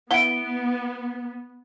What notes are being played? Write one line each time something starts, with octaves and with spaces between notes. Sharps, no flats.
B3 E4 E5 F#5 D7 G7